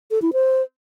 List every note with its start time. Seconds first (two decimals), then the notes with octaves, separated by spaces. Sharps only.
0.11 A4
0.22 E4
0.33 C5